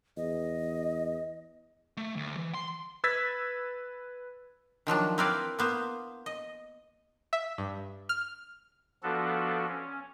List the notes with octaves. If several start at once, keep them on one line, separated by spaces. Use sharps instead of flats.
E2 D#5
A3
D2
E3
C6
B4 E6 G#6 A6 B6
D#3 F3 F#3 D4
C4 E4 A#4 B4 D5 F5
A#3 B3 C5
D#5
E5
G2
F6
F3 B3 D4 F#4 A4
C#4